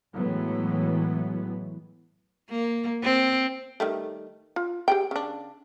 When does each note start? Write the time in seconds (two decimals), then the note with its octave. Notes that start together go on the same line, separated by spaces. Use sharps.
0.15 A2 E3 F#3 G#3 B3
2.51 A#3
3.03 C4
3.80 D#3 G3 A3
4.56 F4
4.88 G4 G#4 G5
5.11 C#3 D4